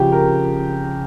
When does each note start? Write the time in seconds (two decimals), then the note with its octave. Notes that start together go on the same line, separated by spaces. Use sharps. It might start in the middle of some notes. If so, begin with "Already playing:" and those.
Already playing: C#3 F3 G4
0.12 A#4